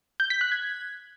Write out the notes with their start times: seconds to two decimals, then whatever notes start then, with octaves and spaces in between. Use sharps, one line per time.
0.20 G6
0.30 B6
0.41 F#6
0.52 G#6